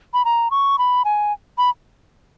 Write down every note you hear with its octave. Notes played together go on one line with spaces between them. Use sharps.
B5
A#5
C#6
B5
G#5
B5